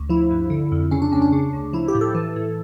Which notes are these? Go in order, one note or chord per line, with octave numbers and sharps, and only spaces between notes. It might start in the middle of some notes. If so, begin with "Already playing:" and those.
Already playing: D2
F3 E4
G2
D3
F2
C#3 C#4
D4
D2 C#4
D4
C#3
D2
F3 E4
G4
A2
A4
E3
A2